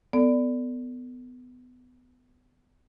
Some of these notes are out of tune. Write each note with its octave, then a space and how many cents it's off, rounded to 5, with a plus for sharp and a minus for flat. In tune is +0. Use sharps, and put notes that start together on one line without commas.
B3 +20 A4 +30 D5 +0